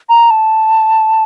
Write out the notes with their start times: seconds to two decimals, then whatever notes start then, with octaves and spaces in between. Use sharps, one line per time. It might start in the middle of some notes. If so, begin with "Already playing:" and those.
0.09 A#5
0.30 A5